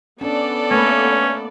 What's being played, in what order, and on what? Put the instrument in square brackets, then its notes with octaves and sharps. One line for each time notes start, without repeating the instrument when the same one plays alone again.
[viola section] B3 D5 [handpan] C#4 D4 [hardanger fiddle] A4
[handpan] A3 A#3 B4 [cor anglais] C#4